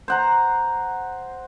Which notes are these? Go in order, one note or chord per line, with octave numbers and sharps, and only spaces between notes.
C5 F#5 A#5